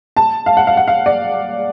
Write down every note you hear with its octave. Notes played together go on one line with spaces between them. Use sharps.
A5
F5
F#5
F5
F#5
F5
D5